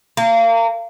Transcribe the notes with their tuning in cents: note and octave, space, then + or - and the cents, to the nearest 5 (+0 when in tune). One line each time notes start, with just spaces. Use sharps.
A#3 -30